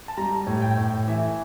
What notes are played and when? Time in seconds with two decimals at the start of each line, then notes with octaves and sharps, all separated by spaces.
0.08 A5
0.17 G3 A#5
0.47 A2
0.62 G5
0.77 A2
1.08 E3 E5